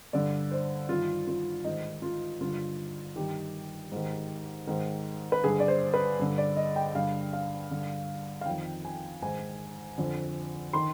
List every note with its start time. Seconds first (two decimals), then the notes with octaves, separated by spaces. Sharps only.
0.13 G2 D3 D5
0.52 C5
0.89 G2 D#3 F4
1.27 F4
1.64 G#2 D#3 D#4
2.02 F4
2.41 G2 D3 F4
3.16 G2 D#3 G4
3.92 G#2 D#3
4.67 G#2 D#3
5.32 B4
5.44 G2 D3 G#4
5.60 D5
5.68 C5
5.94 B4
6.19 G2 D3
6.38 D5
6.57 D#5
6.76 G5
6.95 G2 D3 F5
7.33 F5
7.71 G2 D3
8.41 F5
8.46 F2 D#3 G5
8.85 G#5
9.22 G#2 D#3 G#5
9.98 F2 D3
10.73 D#3 C6